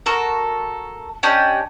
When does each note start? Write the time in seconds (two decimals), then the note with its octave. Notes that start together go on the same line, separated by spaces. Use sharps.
0.06 F#4 A4 A#4
1.23 C#4 D4 G4 D#5